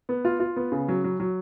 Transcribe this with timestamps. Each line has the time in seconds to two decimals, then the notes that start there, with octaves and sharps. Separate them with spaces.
0.09 B3
0.25 F4
0.40 F4
0.56 B3
0.72 C#3
0.88 F#3
1.04 F#3
1.20 F#3